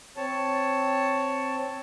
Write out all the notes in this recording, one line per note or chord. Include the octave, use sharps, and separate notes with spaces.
C4 C#5 A5